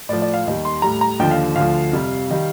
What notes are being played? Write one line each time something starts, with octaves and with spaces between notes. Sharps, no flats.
A2 F3 D5
D5
F5
D#2 D#3 G3
C6
A2 G3 A#5
A#5
D#2 D3 F3 G5
F5
D2 D3 F3 F5
F2 C3 G3
D#3 G3